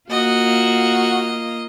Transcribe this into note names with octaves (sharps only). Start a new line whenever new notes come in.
A#3 F4 F#4 D#5